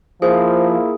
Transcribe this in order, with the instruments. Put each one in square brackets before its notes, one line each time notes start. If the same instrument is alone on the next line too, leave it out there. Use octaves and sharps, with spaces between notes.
[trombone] F3 [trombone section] A#3 E4 F4 [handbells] G#4 [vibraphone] C5